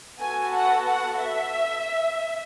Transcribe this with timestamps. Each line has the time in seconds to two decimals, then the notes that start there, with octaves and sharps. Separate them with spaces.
0.19 B3 F#4 A4 G#5
0.54 F#5
0.87 F#5
1.19 E5